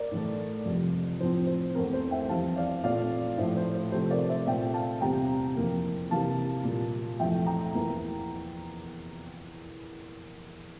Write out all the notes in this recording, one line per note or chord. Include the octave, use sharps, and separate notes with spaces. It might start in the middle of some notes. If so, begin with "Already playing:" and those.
Already playing: A#4 D5
A2 E3 A3
F2 C3 G3
A2 F3 C4 C5
C5
E2 E3 A3 C4 A#4
C5
E5 G5
F2 E3 G3 C4 F5 A5
D5 F5
A#2 A3 C4 D5 F5
A2 F3 A3 C5 E5
C5
C5
C3 F3 A3 C4 C5
A#4 D5
C5 E5
A#2 A3 C4 E5 G5
F5 A5
E2 C3 G3 C4 G5 A#5
F2 E3 A#3
C3 E3 A#3 F5 A5
A#2 G3 A#3
F2 E3 A3 E5 G5
G5 A#5
E2 E3 A#3